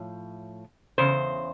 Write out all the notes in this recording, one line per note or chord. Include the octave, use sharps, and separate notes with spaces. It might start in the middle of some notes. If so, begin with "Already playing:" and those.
Already playing: A2 F3
E2 C#3 C5